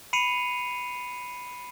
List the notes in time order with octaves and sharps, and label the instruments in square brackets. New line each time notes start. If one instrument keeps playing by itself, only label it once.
[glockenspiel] B5 C7 C#7 D#7 F7